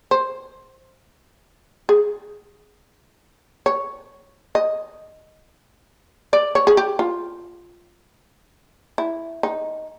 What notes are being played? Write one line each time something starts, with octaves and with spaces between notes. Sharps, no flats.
C5
G#4
C#5
D#5
D5
C#5
G#4
G4
F4
E4
D#4